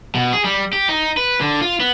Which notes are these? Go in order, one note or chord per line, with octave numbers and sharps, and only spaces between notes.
B2
G#4
G3
G4
D#4
B4
D3
F4
B3